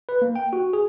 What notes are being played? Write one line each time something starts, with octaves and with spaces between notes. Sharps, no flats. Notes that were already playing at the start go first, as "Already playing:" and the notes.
B4
A#3
G5
F#4
G#4